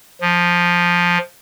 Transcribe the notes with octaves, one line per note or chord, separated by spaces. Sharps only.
F3